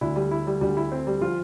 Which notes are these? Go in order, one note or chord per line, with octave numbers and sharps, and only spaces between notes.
D2 D3 E4
G3
E4
G3
D2 D3 G3
E4
C4
G3
F3 F4